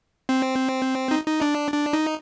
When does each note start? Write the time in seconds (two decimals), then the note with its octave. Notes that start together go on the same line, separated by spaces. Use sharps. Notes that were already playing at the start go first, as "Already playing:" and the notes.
0.29 C4
1.11 D#4
1.27 D#4
1.41 D4
1.73 D4
1.93 D#4